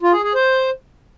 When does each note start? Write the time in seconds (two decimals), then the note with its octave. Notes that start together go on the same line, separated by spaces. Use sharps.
0.02 F4
0.13 G#4
0.24 G#4
0.35 C5